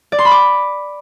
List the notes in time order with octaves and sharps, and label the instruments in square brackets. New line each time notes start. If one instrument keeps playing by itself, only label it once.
[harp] D5
C6
B5
D6